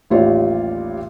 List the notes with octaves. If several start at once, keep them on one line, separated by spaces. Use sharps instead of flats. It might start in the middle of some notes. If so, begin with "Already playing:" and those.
A1 D#2 G3 F4 C#5